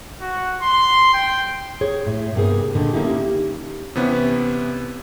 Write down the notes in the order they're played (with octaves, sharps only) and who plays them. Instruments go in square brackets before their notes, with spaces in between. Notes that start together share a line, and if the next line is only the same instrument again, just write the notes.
[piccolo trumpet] F#4
C6
G5
[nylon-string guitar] G#4 C#5
A2
G2 C3 A#3 B3 G#4 G#5
A#2 D3 D#3
F#3 A#3 C#4 D#4 E4 G4
[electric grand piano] C3 E3 B3 C#4 E4